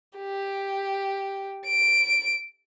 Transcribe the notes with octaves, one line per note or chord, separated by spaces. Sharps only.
G4
D7